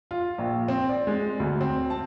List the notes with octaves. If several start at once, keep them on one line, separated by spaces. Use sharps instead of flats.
F4
A#1
C4
D5
G#3
D2
C4
A5